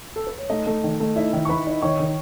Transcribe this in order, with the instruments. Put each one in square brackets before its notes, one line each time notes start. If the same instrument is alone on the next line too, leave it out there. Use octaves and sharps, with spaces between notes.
[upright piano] A4
B4
C#5
[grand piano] A3 [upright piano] D#4 D#5
[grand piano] A3
D#3
A3
[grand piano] D#4 [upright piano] E4 E5
[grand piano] D#3
[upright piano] C#6
[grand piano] D#3 [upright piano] B4 B5
[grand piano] D#4
[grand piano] D#3 [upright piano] C#5 C#6
[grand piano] D#3